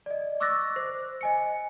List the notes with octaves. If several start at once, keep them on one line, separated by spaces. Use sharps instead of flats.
D5 D#5
C#6 D6 E6 F#6 A6 A#6
C5
D#5 G#5 C#7